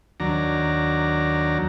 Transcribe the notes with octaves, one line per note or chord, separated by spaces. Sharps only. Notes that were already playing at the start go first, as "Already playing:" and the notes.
D#2 F#3 D4 A#5